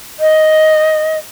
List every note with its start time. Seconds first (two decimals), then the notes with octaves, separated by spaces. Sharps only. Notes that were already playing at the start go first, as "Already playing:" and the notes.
0.19 D#5